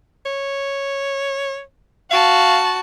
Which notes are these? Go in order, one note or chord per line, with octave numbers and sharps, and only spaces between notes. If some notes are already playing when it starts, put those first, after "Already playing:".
C#5
F#4 F5 A5